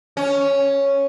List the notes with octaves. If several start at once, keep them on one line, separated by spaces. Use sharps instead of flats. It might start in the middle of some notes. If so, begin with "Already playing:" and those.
C#4